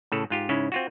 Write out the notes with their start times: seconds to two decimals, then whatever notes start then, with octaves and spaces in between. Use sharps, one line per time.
0.12 A2 C#3 A4
0.30 G#2 F4 G4
0.49 G#2 C#3 C#4 E4
0.72 C4 F4 F#4